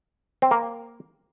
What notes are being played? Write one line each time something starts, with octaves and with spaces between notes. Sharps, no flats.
C4
A#3